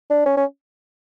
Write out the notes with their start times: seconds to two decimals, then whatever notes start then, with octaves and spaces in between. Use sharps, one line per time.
0.10 D4
0.26 C#4
0.37 C#4